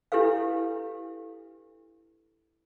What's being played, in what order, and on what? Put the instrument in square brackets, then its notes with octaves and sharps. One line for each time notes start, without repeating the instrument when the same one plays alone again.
[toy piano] D4 E4 G4 A4 B4 F5